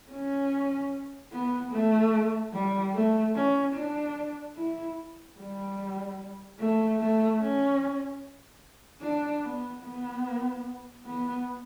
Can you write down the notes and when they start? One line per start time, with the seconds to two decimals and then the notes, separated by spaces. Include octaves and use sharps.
0.11 C#4
1.32 B3
1.72 A3
2.53 G3
2.95 A3
3.35 C#4
3.75 D4
4.57 E4
5.38 G3
6.59 A3
7.00 A3
7.41 C#4
9.02 D4
9.43 B3
9.83 B3
11.06 B3